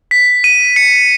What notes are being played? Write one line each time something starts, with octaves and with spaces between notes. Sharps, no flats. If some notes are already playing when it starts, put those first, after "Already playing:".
B6
D#7
C#7